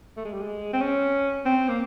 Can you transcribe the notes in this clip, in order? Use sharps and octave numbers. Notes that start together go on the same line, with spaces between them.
A3
G#3
G3
G#3
C4
C#4
C4
A#3